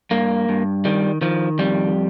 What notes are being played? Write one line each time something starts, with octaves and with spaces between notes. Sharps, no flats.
G2 A#3
G2
D#3 G3
D#3 F3
F2 G3